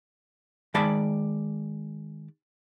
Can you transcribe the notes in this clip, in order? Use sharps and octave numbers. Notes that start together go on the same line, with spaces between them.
D#3 G#3 D5 A5 B5